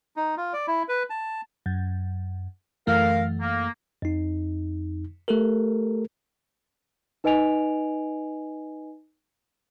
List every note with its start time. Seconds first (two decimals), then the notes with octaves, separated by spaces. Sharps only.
0.16 D#4
0.37 F4
0.53 D5
0.67 E4
0.89 B4
1.10 A5
1.66 F#2
2.87 F#2 E3 A3 A#4 F5
3.41 A#3
4.02 F2 D#4
5.28 A3 G4 A4 A#4
7.24 D#4 B4 D#5 G#5 D7 F7